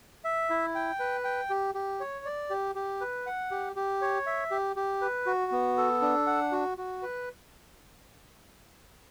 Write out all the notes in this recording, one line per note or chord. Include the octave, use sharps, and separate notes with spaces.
E5
E4
G5
B4
G5
G4
G4
C#5
D5
G4
G4
B4
F#5
G4
G4
C#5
E5
G4
G4
B4
F#4
B3
A4
D4
F#5
F#4
F#4
B4